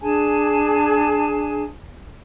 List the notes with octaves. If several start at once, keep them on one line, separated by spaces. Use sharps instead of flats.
D4 G#4 G#5 A5